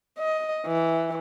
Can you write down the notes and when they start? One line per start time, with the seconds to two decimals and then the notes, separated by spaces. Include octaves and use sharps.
0.19 D#5
0.66 E3